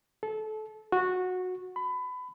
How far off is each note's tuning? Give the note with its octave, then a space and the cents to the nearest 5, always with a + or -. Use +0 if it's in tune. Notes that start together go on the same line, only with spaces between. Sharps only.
A4 -25
F#4 -15
B5 +25